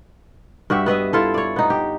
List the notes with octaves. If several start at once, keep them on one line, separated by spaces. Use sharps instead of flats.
G2 F#4 G4 E5
B3 B4 D#5 E5
E4 F4 A4
C#5 D5
B3 D#4
G4